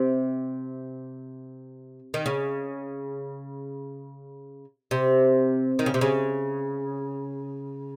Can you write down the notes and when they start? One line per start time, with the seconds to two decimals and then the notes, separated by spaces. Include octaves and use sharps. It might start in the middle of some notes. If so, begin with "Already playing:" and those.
Already playing: C3
2.14 D#3
2.26 C#3
4.91 C3
5.79 D#3
5.86 C#3
5.94 C3
6.01 C#3